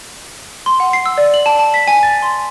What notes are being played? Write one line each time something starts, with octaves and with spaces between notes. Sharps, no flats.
C6
F#5
C7
E6
D5
F#7
A5
A5
B6
G#5
A6
C6